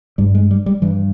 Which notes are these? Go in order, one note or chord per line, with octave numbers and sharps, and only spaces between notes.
G2 G3
G#3
G3
G3
G2 E3